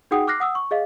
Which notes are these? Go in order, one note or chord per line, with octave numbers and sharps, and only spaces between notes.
D#4 F#4 G#4 F#5 G5 D#6
D6 F6 F#6 A#6 C7
F#5 D#6 E6
C#6
G#4 D#5 F5